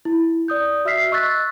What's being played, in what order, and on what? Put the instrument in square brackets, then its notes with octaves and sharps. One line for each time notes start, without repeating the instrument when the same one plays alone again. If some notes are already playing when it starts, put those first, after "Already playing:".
[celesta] E4
D5 D#6 G6
F#4 E5 E6 F6 B6 C7
D#5 C#6 E6 F#6 A6 B6